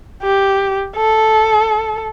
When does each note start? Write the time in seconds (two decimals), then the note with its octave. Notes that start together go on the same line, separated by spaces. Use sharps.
0.23 G4
0.97 A4